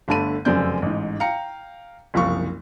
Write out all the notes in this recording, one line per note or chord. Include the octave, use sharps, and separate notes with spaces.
G1 D3 A3 A5 B5 D#7
F1 F#2 C#3 C4 D5 G6
A1 G#2
F5 G5 A#5 C#7
F#1 C2 F3 F5 C#6